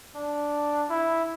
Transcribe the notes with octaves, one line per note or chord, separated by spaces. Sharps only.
D4
E4